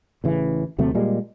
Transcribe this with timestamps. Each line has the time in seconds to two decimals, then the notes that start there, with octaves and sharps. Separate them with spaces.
0.24 A1 C#3 E3
0.78 D#2 C3 F#3 A3
0.95 A#2 G3 G#3 A#3